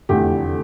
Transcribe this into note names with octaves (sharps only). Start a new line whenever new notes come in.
F1 E2 D3 A3 G4